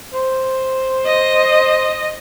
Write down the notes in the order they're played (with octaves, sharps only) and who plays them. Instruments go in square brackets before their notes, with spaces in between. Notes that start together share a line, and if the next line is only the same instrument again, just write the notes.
[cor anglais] C5
[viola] D#5